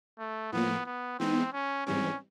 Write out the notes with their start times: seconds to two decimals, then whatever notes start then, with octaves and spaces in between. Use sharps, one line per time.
0.19 A3
0.52 A2 F3 A#3 B3
0.86 B3
1.19 E3 G#3 B3 C4 D#4
1.53 C#4
1.86 G#2 E3 G3 C4 C#4